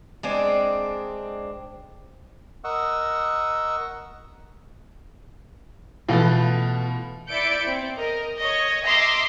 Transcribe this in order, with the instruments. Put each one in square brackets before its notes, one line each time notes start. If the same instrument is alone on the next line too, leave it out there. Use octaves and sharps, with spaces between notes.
[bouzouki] G#3 C4 D4
[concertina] A#4 D#5 F#5 C#6 E6
[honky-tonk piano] B2 F4 [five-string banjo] E3 A3 B3
[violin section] E4 D5 E5 G6 C#7 D7
C4
A#4 D#5
C#5 D#5
D#5 E5 A#5 C6 D6 A#6